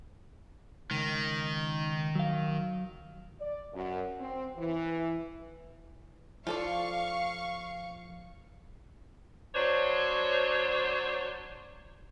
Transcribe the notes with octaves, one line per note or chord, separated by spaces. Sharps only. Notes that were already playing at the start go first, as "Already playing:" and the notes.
C#2 D#3
F#3 F5
D5
F#2
C4
E3
F3 F4 A4 D5 F5 C#6
F#3 D4 C5 C#5